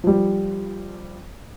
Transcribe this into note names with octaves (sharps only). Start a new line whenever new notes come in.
F3 G3